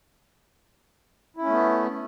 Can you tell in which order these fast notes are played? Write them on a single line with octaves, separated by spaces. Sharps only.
E4 C#4 A3 B3